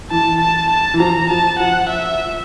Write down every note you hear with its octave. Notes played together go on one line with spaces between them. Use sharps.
E3 A5
A5
A5
E3
F3 A#5
F3 A5
F3 F#5
E5